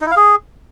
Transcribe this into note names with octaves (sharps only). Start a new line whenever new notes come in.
D#4
E4
F5
G#4